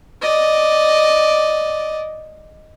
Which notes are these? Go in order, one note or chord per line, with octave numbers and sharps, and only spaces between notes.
D5 D#5